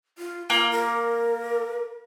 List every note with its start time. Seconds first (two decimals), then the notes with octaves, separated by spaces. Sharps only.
0.18 F4
0.50 A#3 F4
0.71 A#4